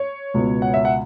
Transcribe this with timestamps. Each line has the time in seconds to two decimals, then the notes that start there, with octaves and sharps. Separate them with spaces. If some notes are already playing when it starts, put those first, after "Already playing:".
Already playing: C#5
0.34 C#2 B2 B3
0.62 F#5
0.74 E5
0.85 F#5